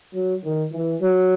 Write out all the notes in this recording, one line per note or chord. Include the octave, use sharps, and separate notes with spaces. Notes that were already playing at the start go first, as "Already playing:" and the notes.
F#3
D#3
E3
F#3